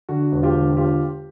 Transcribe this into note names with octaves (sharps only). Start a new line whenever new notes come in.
D3 F#4
E1
F4 G4
D3
F4 G4